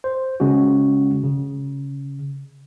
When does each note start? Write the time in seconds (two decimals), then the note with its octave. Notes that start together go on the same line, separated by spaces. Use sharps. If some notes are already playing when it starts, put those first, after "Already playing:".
0.04 C5
0.40 C#3 G#3 C#4 F#4
1.24 C#3